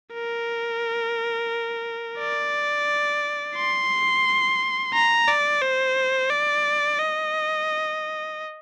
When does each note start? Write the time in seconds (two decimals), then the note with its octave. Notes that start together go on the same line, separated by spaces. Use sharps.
0.13 A#4
2.19 D5
3.56 C6
4.94 A#5
5.28 D5
5.62 C5
6.30 D5
6.99 D#5